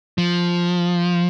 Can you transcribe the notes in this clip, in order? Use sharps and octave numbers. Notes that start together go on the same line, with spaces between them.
F3